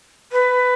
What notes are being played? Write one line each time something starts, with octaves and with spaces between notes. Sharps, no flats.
B4